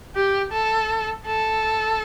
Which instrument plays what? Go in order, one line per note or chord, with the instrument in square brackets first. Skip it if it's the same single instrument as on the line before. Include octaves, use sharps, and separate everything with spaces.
[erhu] G4
A4
A4